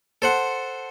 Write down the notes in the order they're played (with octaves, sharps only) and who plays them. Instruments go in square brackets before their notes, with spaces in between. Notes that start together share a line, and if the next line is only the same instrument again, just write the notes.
[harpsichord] A4 C5 F#5